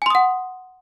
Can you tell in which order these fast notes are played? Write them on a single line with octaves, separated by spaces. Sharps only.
G#5 C6 D#6 F#5